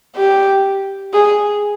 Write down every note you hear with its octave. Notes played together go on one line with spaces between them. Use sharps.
G4
G#4